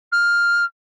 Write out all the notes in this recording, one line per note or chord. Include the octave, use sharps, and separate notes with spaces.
F6